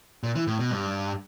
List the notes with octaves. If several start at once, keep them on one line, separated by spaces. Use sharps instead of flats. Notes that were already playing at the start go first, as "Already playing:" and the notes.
A#2
E3
A2
B2
G2